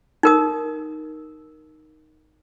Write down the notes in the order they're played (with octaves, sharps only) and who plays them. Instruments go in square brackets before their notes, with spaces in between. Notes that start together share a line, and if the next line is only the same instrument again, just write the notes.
[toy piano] D#4 A#4 D#6